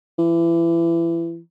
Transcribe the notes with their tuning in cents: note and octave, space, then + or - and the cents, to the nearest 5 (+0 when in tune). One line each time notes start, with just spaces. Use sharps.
E3 +25